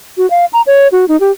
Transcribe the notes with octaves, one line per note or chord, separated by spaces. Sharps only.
F#4
F5
A#5
C#5
F#4
D#4
G4